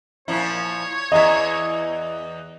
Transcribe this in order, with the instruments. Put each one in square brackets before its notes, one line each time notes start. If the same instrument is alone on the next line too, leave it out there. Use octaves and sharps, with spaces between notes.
[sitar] A#2 F3 E4 [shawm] C#5
[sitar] E2 E5 [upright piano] D#5